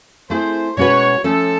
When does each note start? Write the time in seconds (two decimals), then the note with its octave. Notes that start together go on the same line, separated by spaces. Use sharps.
0.30 A3 C4 E4 G#4 C5
0.77 B2 G#3 C#4 F#4 B4 C#5
1.24 F3 A3 C#4 A4